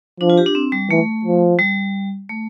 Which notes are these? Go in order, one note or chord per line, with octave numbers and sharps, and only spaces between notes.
F3 D4
F4
G4
D4
C4
G3
E3 A3
F3
G3
A3